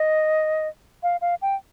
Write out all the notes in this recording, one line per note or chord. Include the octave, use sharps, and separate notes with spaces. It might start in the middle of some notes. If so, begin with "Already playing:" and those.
Already playing: D#5
F5
F5
G5